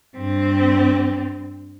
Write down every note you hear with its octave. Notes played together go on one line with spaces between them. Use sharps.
G2 C4